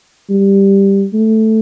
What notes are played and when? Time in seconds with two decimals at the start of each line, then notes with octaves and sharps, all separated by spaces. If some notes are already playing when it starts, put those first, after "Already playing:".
0.30 G3
1.13 A3